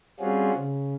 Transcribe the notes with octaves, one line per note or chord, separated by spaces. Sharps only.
G3 C4 C#4 F4 F#4 G#4
C#3